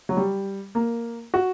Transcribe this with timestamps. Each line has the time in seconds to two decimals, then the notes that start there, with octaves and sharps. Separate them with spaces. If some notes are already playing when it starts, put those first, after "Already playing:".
0.09 F#3
0.17 G3
0.75 A#3
1.34 F#4